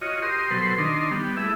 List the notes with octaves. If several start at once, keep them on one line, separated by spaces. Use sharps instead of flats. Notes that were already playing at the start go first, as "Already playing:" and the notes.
F4 F#4 C#5 D#5
G4 A#4 C6 D#6
B2 F#3 A4 B4 C5 C6
D#3 D4 D#4 C6
G3 B3
A3 E4 G#4 E5